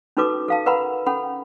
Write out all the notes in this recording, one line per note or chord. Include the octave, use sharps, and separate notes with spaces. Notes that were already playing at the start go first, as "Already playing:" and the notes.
C#4 D#4 F#4 A4 B4 D6
A4 F5 A5
A#4 B4 F#5 A#5 B5
C#4 A4 F#5 B5